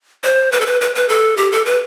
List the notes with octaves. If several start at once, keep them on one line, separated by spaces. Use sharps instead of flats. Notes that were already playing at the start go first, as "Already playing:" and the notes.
C5
B4
A4
B4
B4
B4
A4
G4
A4
B4